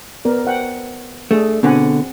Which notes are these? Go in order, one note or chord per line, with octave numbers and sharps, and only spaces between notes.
B3 A#4 D5
C5 F#5 G5
A3 D4 G#4
B2 D3 C4 F#5 G#5